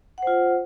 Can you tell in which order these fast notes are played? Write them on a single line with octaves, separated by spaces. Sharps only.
F#5 C5 F4